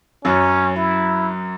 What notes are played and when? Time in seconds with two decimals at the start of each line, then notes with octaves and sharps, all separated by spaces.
0.24 F#2 F#3 C#4
0.76 E4